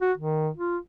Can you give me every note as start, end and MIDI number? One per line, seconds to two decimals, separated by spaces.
0.01 0.12 66
0.18 0.50 51
0.57 0.78 65